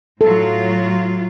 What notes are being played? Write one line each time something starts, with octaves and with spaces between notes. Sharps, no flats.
A2 F#3 F4 A4